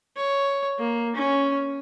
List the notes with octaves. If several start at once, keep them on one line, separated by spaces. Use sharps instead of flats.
C#5
A#3
C#4